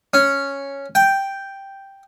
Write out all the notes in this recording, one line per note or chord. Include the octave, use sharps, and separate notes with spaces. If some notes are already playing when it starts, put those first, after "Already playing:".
C#4
G5